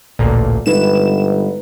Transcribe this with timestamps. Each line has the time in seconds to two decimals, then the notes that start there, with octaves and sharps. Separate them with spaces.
0.19 A1 D2 A#2
0.66 G1 G#3 D#4 B4 E7